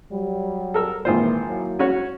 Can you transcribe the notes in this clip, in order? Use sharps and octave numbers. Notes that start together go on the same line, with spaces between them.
F#3 G3
A4 A#4 E6
G#1 A#2 E3 A#3 F4 C5
F#3 A#3 E4
C#4 F#4 C#5